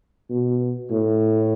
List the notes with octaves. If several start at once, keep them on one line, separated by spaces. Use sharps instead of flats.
B2
A2